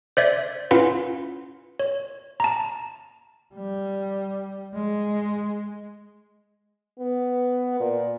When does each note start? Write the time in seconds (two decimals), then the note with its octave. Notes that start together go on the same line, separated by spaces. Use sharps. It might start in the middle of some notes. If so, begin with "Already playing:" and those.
0.17 C5 D5 E5 G#6
0.71 C#4 E4 F4 B4 F5 F#5
1.80 C#5
2.40 A5 A#5
3.54 G3
4.74 G#3
6.99 B3
7.80 A#2